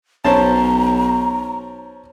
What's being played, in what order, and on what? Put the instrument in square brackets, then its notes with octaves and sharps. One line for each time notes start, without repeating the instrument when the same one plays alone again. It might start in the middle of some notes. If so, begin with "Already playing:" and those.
[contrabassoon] B1 [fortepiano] C#4 C5 A5 [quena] A#5